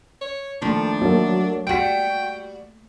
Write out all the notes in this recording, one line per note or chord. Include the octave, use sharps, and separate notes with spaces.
C#5
D#3 F3 A3 A#3 D4
F#3 A#3 E5
G3 F#4 G5 B6 D7